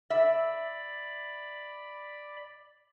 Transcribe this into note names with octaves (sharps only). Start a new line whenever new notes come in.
D5 E5 B5